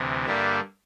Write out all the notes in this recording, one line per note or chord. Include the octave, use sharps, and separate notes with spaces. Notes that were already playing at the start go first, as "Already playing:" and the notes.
Already playing: D2 C3 E3
G2 D3 G3 A#3 D4 E5